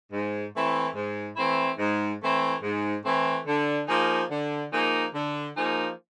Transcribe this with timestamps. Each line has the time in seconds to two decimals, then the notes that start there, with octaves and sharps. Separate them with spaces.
0.12 G#2
0.54 E3 A3 C4 E4
0.95 G#2
1.37 E3 A3 C4 E4
1.78 G#2
2.22 E3 A3 C4 E4
2.62 G#2
3.05 E3 A3 C4 E4
3.47 D3
3.88 F3 A#3 D#4 G#4
4.30 D3
4.72 F3 A#3 D#4 G#4
5.14 D3
5.56 F3 A#3 D#4 G#4